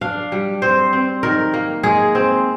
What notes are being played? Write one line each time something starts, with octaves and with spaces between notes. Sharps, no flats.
D4 F5
G3
C4 C5
C4
D#3 A#4
A#3
G#3 G#4
C4